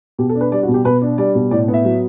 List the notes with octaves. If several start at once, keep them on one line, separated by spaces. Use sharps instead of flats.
B2 G4
A4
D4
B4
G3 D5
F#4
B2
G4
B2 B4
D4
G3 D5
B2
A2 D5
B3
E5
F#3